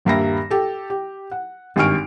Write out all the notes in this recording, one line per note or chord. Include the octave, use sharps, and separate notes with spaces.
D#1 G2 A#3 E5 B5 A#6
G4 A4
G4
F#5
G#1 G2 G#5 C#6 F6 D7